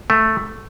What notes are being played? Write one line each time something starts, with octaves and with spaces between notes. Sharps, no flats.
A3